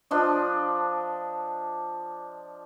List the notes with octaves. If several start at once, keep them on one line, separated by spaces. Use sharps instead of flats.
F3 D4 D#5